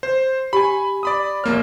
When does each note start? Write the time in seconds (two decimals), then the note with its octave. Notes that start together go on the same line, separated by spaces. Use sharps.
0.03 C5
0.53 G4 G#5 B5
1.03 D5 B5 D#6
1.44 A#1 A#3 C#5 F6